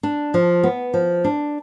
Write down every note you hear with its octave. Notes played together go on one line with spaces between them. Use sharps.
D4
F3
B3
F3
D4